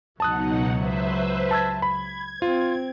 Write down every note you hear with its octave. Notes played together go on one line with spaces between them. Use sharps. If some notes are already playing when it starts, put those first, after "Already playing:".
C#2 B2 F#3 D#4 F#5 A5 D#6 F#6
B4 C5 E5
A5 E6 G#6
B5 G#6
C4 F4